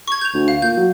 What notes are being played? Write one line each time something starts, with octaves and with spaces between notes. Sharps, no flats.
C#6 G#6
G6 F7
D2
F5
A#2 G6
F#3